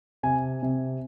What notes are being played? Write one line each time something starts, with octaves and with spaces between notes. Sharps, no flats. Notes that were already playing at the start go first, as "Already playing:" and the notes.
C3 G#5
C3